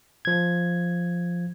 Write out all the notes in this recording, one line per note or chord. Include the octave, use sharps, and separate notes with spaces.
F3 G#6